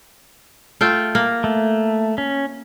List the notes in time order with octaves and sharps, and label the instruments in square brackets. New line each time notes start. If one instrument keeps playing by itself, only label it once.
[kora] A3 F4 G5
A#3
[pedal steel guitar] A3
C#4